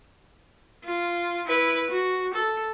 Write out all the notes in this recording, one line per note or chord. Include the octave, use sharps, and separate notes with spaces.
F4
E4 B4
F#4
A4